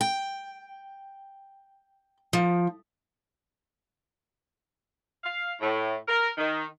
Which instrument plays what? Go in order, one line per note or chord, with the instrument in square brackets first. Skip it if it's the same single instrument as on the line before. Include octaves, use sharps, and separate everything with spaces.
[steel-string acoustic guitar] G5
F3
[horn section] F5
A2
A#4
D#3